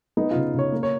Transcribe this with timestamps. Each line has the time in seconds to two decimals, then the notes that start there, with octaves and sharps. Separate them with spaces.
0.17 B3 D#4
0.31 C#3 F4
0.54 C#3 C#5
0.72 A#3
0.83 C#5